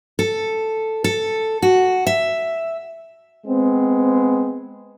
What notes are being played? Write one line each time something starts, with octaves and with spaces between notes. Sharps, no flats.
A4
A4
F#4
E5
G#3 B3 C4